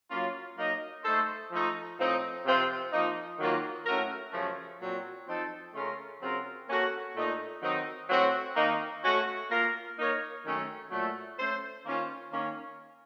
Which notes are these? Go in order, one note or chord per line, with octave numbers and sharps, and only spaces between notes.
F#3 A#3 C#4 F4
F#3 A#3 D#4 A#4 D#5
A3 D#4 A4 C5
F3 A3 D#4
A2 F3 C4 D#4
C3 F3 C4 F4
F3 A#3 D#4
D#3 F#3 A#3 F4
A2 A3 C#4 F#4 A#4
F#2 C#3 F3 A3 C#4
A#2 F#3 C4
F3 C4 D#4 A4
C#3 A3 C#4 F4 A#4
C#3 F#3 C4 F4 A#4
A#3 C#4 F#4 A4
A#2 A3 D#4
D#3 F#3 C4 D#4
A2 F#3 C4 F#4
D#3 A#3 D#4
A3 C#4 F#4
A#3 F4 A#4
A#3 D#4 A#4 C#5
F#2 D#3 A3 C#4
A#2 F#3 A3
A3 C#4 A4 C5
D#3 A#3 C#4 F4 C5
D#3 A#3 C#4